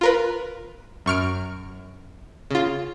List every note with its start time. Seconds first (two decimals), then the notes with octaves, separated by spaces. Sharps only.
0.01 F4 A#4 B4
1.06 F#2 C#6 F6 D7
2.51 C#3 F4